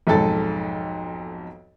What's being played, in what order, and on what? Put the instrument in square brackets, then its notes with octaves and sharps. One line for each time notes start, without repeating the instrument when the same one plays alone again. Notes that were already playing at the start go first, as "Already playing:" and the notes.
[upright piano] B1 F2 G#2 A4 A6